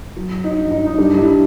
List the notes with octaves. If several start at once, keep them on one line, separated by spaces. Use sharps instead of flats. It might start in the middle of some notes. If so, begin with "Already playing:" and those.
F#3
D#4
G2
D#4
D#4
G3 D4
D4 E4